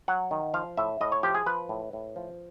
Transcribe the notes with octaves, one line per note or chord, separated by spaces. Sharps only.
F#3 F#5
D#3
F3 F5
A2 E5
A2 D#5
C#5
F3 G4
G#4
F3 B4
A2
A2
F3